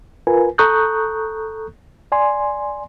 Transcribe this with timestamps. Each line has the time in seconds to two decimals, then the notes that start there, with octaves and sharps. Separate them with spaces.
0.27 F4 A#4 B4 G#5
0.58 A4 A#5 C#6 D#6 F#6 G6
2.12 D5 G#5 C6